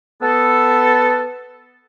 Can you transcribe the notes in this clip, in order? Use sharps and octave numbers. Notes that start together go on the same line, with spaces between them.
B3 A4